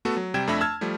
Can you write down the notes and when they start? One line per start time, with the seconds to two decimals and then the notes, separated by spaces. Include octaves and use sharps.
0.05 A3 B3 F#4 A4
0.17 F#3
0.34 C3 G3 G5 G#6 E7
0.47 F2 A3 D4 E5 B5 A#6
0.61 A5 E6 F6 G#6
0.81 F3 G3 A3